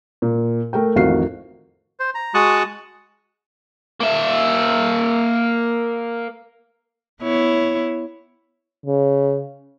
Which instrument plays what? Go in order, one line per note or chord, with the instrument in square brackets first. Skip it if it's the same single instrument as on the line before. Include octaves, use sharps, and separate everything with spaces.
[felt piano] A#2
A3 A#4 G5
A1 F2 D#3 F#4 F5 C7
[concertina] C5
A#5
G#3 F#4 A5 C#6 D#6 F#6
[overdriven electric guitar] A#3 E5
[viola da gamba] B3 E4 C#5
[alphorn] C#3